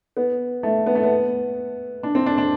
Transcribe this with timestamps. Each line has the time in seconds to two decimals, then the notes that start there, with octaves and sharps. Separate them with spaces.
0.17 B3
0.63 A3
0.86 B3
0.95 A3
1.04 B3
2.03 D4
2.15 C4
2.26 D4
2.38 D4